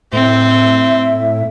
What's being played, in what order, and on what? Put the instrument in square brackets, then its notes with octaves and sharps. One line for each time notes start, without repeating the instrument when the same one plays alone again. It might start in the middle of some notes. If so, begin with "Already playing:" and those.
[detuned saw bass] A2 [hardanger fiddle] C4 [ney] E5